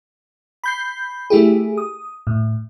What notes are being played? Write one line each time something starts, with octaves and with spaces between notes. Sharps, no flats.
B5 G6 C7
A3 E4 G4 G#4
D#6
A2